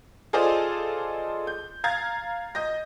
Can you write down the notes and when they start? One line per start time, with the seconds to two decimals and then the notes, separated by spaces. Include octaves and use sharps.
0.33 F4 G#4 A4 C5 D5 D#5
1.47 G6
1.84 F5 A#5 G#6 A6
2.55 D#5 G6 A#6